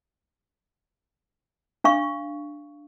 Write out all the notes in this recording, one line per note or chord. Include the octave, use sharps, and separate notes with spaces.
D4 F5 C#6